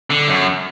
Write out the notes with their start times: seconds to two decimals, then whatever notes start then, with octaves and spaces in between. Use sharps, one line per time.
0.10 D3
0.28 F#2